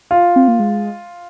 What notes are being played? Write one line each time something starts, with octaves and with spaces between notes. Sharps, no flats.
F4
C4
A#3
G#3